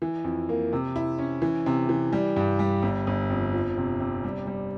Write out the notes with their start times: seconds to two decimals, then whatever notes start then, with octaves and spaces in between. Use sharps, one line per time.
0.02 E3
0.24 F2
0.49 A#3
0.73 C3
0.96 E4
1.18 C#4
1.42 E3
1.66 C3
1.89 E3
2.13 G3
2.36 G2
2.59 G3
2.83 G1
3.07 G1
3.30 F2
3.53 F3
3.78 C3
4.00 C3
4.24 G3
4.47 G3